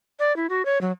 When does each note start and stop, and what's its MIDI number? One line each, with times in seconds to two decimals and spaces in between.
0.19 0.35 74
0.36 0.47 64
0.50 0.65 66
0.65 0.81 73
0.81 0.92 54